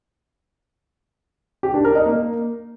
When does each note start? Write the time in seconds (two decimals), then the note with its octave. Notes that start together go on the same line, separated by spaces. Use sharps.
1.63 G4
1.74 D4
1.85 A#4
1.95 D#4
2.06 A#3